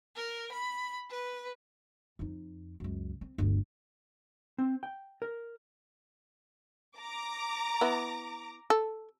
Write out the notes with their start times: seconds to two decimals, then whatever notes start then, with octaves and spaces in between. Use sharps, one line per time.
0.16 A#4
0.52 B5
1.10 B4
2.19 F2 D#4
2.80 C#2 F#2
3.21 C4
3.38 G1 D2
4.58 C4
4.83 G5
5.22 A#4
6.97 A#5 D6
7.81 B3 E4
8.70 A4